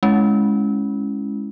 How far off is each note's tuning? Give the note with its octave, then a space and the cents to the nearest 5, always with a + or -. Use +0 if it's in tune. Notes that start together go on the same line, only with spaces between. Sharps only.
G#3 +15 C#4 +0 E4 +0